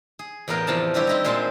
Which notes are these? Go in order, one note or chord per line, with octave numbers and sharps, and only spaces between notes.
G#4
E2 A2 B3 A#4 F5 G5
E2 C3 F3 D5 F5 A5
D3 G3 C4 E4 G4 C#5
C4 D#4 E4 D5 D#5
A#2 G#3 C4 C5 A5 C6